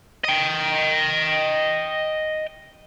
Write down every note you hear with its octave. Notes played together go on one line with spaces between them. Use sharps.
D#5 G5